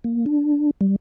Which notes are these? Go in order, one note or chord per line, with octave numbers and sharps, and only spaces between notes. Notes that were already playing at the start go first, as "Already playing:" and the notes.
A#3
D4
G3